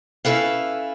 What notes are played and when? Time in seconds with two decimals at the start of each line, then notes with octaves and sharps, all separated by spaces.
0.25 C#4 E4 A4 B4 F5